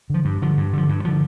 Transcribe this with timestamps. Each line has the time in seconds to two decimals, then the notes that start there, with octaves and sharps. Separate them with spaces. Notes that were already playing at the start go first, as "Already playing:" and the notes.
0.10 D3 F3
0.25 G2
0.42 D3 F3
0.57 G2
0.73 D3 F3
0.89 G2
1.05 D3 F3